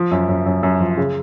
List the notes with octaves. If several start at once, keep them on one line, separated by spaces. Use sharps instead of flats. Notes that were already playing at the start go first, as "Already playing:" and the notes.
Already playing: F3
F#2
F#2
F#2
F#2
F3
C#3